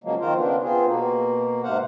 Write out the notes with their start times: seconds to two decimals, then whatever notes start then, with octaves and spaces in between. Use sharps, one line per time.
0.04 C#3 F3 F#3 G#3 A#3
0.21 D#3 C4 F4 A#4 C5
0.37 C#3 B3 D4
0.63 B3 C4 F4 G#4
0.86 B2 A#3
1.64 G#2 C3 C5 F5 F#5